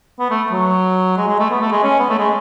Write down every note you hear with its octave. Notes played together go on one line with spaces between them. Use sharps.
B3
A3
F#3
G#3
G#3
A3
B3
A3
G#3
C#4
B3
A3
G#3